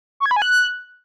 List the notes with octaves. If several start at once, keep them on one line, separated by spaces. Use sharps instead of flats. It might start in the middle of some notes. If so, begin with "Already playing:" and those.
C#6
G#6
B5
G#5
F#6